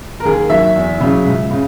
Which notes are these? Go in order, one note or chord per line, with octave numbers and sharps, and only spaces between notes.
A#4
D#2 G#4
D#3 F#3 E5
E2
C#3 F#3
C#2
C#3